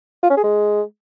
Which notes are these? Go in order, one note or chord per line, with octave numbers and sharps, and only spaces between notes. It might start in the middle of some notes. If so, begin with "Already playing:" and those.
F4
C#4
G#4
G#3